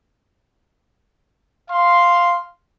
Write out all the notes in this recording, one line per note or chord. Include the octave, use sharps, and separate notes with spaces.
F5 C6